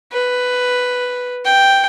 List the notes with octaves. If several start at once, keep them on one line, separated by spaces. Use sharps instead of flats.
B4
G5